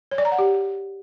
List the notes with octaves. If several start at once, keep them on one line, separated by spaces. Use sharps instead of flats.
C#5
D5
A#5
F#5
G4